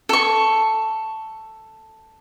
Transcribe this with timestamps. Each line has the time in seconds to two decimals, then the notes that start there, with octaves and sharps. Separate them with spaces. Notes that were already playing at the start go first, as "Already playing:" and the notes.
0.09 A4 C#6